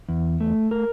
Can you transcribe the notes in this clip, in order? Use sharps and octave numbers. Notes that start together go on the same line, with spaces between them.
E2
A3
A#4